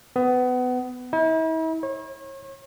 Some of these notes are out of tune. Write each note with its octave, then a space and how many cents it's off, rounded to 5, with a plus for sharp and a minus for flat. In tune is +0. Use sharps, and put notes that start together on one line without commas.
B3 +25
E4 -45
C#5 -35